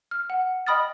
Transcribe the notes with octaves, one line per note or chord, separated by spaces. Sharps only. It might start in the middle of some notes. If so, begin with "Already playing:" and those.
F6
F#5
D#5 G5 B5 D#6 F6 A6